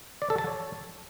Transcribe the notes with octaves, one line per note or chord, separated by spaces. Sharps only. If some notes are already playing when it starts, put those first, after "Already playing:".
D5
A4
A5
C#5